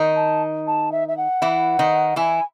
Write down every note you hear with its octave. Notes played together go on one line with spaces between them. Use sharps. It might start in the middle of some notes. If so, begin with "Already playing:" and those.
Already playing: D#3 D#4
A5
A5
E5
E5
F#5
E3 E4
D#3 D#4
E3 E4 G#5